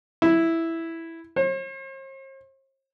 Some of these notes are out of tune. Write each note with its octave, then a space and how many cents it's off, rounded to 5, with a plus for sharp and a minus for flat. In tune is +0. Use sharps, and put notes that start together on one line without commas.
E4 +0
C5 +45